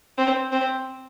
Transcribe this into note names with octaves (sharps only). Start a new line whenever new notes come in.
C4
C4